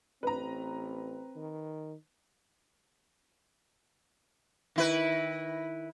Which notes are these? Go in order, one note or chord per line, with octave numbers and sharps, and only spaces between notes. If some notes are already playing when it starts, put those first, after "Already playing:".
A1 C4 B4 A#5
D#3
D#3 E4 B4